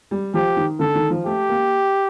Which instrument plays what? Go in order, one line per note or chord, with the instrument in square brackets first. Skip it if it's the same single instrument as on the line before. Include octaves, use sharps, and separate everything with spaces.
[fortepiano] G3
[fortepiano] F3 [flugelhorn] G4
[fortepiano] D#3
[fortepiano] D3 [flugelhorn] A4
[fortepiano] D#3
F3
[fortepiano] A3 [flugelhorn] G4
[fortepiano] A#3